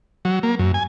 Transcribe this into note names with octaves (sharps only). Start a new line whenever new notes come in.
F#3
A#3
F#2
G#5